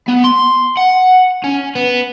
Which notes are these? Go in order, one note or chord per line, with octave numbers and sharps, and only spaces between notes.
B3
C6
F#5
C#4
B3